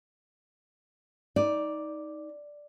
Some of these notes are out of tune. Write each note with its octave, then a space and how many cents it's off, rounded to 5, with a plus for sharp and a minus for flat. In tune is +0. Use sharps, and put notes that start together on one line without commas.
D#4 +15 D5 +0